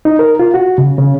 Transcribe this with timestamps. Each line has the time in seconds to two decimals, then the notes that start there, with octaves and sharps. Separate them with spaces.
0.05 D#4
0.19 A#4
0.39 F4
0.54 F#4
0.78 C#3
0.98 C#3